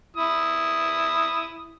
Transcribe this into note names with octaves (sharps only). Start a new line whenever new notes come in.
E4 D#6